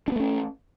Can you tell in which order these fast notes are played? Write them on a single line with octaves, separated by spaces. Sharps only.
D4 B3 A3 C#4